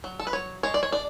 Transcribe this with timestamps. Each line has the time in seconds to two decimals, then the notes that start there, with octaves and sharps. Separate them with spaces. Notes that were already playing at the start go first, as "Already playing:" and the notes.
0.04 F#3
0.20 A4
0.27 B4
0.33 F#3 C#5
0.63 G#3 C#5
0.74 D5
0.83 C#5
0.92 D4 D5